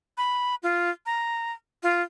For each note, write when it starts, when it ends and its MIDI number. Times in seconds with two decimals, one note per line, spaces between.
0.18 0.55 83
0.63 0.90 65
1.06 1.52 82
1.83 2.02 65